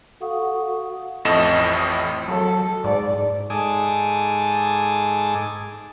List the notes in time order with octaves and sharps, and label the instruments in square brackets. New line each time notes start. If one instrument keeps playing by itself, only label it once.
[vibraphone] F#4 A4 F5 F#5 C#6 D#6
[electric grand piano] A1 F2 A2 D#5 A5 E7
[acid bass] F#3 [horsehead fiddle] A4
[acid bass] G#2 [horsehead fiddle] D5
[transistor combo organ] G#2 A4 G#5 D6 D#6